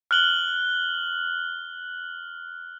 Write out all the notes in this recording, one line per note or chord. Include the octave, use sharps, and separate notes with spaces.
F6 F#6 F#7 G7